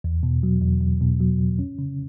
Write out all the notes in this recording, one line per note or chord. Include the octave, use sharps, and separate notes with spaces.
E2
B2
F#3
E2
E2
B2
F#3
E2
C#4
C#3